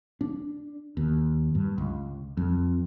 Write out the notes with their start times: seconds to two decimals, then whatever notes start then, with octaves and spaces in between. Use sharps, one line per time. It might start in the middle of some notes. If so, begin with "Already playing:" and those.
0.21 D4
0.97 D#2
1.55 G2
1.78 C#2
2.37 F2